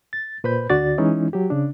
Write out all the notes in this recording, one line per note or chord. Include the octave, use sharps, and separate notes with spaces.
A6
A#2 B4 C5 B5 G6
D2 D3 F#4 D5 A6
E3 G#3 C#4 D#4 E4
F#3 G4
C#3 D4